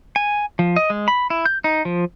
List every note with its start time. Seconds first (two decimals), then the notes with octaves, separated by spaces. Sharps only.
0.16 G#5
0.59 F3
0.76 D#5
0.90 G#3
1.08 B5
1.30 E4
1.46 G6
1.64 D#4
1.85 F3